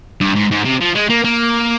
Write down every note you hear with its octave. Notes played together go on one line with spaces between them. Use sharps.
G2
G#2
G#2
C3
F3
G#3
A#3
A#3